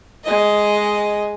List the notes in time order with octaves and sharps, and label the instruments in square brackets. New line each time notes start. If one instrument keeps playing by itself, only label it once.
[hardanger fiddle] G#3 D#5